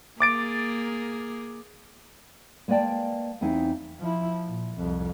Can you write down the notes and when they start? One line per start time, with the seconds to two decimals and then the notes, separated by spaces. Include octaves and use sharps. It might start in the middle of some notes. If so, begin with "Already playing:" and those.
0.20 A#3 G#4 D6 A6 D7
2.68 G#3 A#3 B4 D5 G5 A5
3.41 E2 C4 D#4 E4 C5 F5
4.00 F3 E4
4.46 A#2
4.78 C2 F2